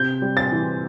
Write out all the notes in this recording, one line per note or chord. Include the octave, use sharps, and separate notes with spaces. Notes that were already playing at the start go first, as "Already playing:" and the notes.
Already playing: C3 G6
G3
A6
E3